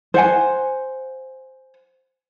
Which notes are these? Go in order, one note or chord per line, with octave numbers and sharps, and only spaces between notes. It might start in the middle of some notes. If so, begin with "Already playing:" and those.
C5 F#5 G#5